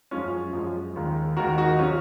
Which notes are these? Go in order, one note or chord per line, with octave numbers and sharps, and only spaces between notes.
F#2 F3 G#3 C#4 F4
F#2 F3 G#3
D#2 D#3 G#3
D#2 D#3 G#3 F#4 A#4
D#4 F#4
C3 F#3 C4 C#4 F4